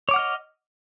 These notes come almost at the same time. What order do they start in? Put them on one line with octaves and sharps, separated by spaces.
C#5 D6 F#5 F6 D#5